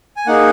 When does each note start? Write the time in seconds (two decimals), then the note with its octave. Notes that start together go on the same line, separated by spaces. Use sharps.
0.17 G#5
0.27 A#3 D#4 G#4 F#5